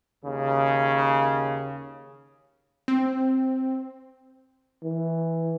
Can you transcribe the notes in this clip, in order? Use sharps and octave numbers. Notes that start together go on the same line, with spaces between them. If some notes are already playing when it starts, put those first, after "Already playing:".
D#2 C#3
C4
E3